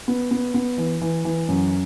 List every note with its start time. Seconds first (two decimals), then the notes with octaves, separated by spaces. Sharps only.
0.08 B3
0.31 B3
0.54 B3
0.78 E3
1.01 E3
1.25 E3
1.48 F#2